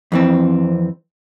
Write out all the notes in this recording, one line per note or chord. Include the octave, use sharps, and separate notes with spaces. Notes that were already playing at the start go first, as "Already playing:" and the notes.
F2 E3 C4